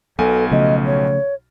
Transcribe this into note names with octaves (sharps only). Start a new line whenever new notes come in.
B1 B2 F#3 B3 A4 G#5
C#3 F3 A3 D#5
C#5